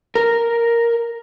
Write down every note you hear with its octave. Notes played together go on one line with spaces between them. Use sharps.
A#4